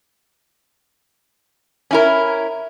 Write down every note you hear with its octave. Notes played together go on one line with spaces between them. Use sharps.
C#4 E4 A#4